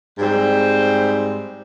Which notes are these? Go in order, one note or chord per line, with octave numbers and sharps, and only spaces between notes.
G#2 G3 C4